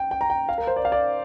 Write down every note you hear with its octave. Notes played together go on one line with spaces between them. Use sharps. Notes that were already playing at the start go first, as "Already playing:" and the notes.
Already playing: G5
G5
A#5
G5
F5
A#4
C5
D5
F5
D5